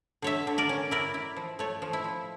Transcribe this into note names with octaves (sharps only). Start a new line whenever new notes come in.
D3 C#5 E5
D3
A#4 D5
C#4
E4 A#4 D5
E4
F3
A3 A4 C#5
F3
E4
F3